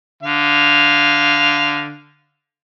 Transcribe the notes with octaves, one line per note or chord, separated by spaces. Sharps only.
D3 F5